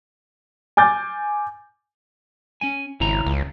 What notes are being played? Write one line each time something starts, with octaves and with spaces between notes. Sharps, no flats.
G#5 D6 G6 A6
C#4 G#5
G#1 C#3 E4 A#5
C#2